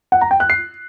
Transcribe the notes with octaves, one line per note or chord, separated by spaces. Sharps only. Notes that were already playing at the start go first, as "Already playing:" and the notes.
F#5
A#5
G5
F#6
C7